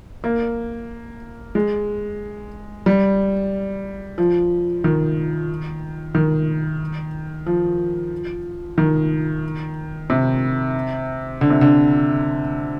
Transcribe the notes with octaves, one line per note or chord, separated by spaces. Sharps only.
A#3
G#3
G3
F3
D#3
D#3
F3
D#3
C3
D3
C3
D3